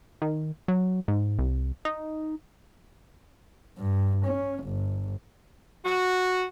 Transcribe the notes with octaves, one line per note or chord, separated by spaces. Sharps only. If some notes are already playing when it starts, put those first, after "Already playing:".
D#3
F#3
G#2
C2
D#4
G2
C#4
G1
F#4